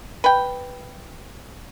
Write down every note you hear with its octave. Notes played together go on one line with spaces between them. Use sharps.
B4 G5